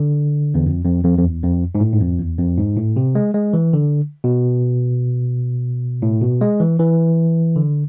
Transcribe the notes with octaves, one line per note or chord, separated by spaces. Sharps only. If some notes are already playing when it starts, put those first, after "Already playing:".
Already playing: D3
E2
F2
F2
F2
F2
E2
F2
G#2
A2
G#2
F2
E2
F2
G#2
A2
C3
G#3
G#3
E3
D3
B2
A2
B2
G#3
E3
E3
D3